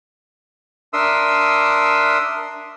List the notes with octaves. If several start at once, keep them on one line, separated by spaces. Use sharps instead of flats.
D4 A#4 E5 C6 D#6 E6